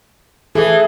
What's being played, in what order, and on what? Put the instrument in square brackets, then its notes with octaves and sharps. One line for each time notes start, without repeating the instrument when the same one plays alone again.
[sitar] E3 [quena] G#4 [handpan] A4